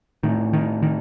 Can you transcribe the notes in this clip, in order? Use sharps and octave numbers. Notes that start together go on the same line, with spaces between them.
A2 D#3
D#3
D#3